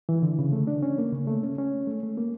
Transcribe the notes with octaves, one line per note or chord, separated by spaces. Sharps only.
E3
D3
C#3
A3
D4
C#4
A#3
C#3
A3
C#4
C#4
A3
A3
A#3